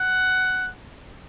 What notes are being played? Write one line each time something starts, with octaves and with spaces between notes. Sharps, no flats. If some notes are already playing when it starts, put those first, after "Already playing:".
Already playing: F#5